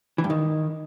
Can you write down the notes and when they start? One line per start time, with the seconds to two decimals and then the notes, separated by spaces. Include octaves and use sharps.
0.18 E3
0.24 G2
0.30 D#3